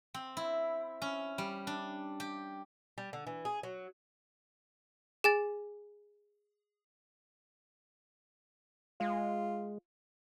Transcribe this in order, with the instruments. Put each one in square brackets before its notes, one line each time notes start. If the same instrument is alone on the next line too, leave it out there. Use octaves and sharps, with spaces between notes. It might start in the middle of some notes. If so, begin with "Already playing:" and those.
[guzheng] C4
E4
C#4
G3
D4
G4
[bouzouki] G3
D3
E3
G#4
F#3
[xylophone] G#4 G#5 A6
[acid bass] G#3 [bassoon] F4